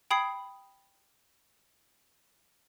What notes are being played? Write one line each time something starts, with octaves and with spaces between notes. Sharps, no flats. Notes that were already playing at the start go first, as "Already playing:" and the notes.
G5 B5 D#6 G#6 C7